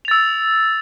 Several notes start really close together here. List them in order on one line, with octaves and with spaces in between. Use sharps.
F7 A6 E6